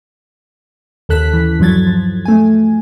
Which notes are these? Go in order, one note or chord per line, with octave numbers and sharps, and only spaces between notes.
D#2 C#3 A4 F#6 B6
E3
G2 F3 F#3 G#6 A6
F3
A3 G#5